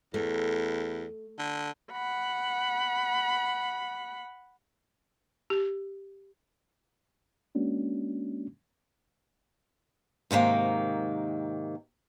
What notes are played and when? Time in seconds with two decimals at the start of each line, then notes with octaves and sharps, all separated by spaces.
0.14 E2 A3
1.39 D3
1.92 F#5 B5
5.50 G4
7.55 G#3 A#3 C#4 D4 F#4
10.31 G#2 C3 D#3 A#3